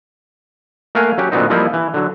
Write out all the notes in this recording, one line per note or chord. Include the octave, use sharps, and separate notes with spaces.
A3 A#3 A#4 F5 F#5 G#5
F#3 C#4 G4
A#2 D3 F#3 B3 C4 D#4
F3 G3 A#3 C4 D#4 E4
E3
D3 F#3